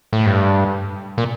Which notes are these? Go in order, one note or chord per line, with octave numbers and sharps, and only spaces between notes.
A2
G2
A#2